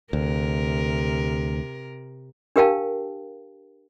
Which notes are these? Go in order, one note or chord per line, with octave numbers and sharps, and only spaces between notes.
D2 C3 A#4
D4 G4 A#4 F5 G5 A5